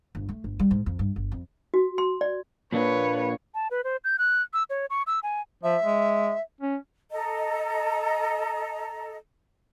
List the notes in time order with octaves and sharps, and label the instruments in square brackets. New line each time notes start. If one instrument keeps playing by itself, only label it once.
[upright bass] G1
A3
G1
G3
G#2
F2
G2
G1
F2
[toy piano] F#4
C6
D5
[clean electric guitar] A#2 A#3 D4 [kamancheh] B4 C#5
[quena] A5
B4
C5
G6
F#6
E6
C#5
C#6
E6
G#5
[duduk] F3 [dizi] E5
[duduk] G#3
C#4
[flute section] A4 D#5 A#5